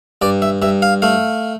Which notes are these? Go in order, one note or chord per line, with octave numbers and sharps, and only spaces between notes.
G2 D5
E5
G2 E5
F5
A3 F5